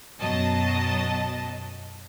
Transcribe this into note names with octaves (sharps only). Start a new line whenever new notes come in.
F#2 B2 F#3 D#5 A5